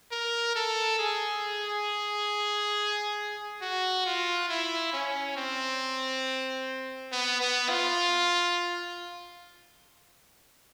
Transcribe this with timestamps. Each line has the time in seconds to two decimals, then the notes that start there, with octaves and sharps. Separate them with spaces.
0.12 A#4
0.56 A4
0.99 G#4
3.62 F#4
4.06 F4
4.49 E4
4.93 C#4
5.37 C4
7.12 B3
7.41 B3
7.70 F4